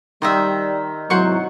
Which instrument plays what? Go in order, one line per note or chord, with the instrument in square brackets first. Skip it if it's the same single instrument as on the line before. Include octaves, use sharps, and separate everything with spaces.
[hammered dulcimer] D#3 [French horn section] G3 [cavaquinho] C5 D#5 E5
[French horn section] G#2 C3 E4 [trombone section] F#3 [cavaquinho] C5 F#5 C#6